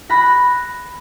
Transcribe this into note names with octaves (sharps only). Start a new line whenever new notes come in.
B5 F#6 A#6